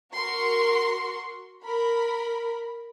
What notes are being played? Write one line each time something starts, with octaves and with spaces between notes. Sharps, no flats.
F#4 A#4 C6 C#6
A#4 B5